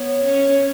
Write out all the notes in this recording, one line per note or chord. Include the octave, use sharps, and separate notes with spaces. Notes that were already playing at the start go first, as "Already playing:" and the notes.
Already playing: B3 C#5
C#4